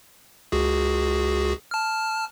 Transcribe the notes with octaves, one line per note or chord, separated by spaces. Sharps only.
C#2 F#4 G#4
A5 F6